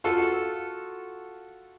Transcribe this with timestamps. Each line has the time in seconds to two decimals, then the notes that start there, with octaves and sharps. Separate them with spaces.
0.04 F4 F#4 A4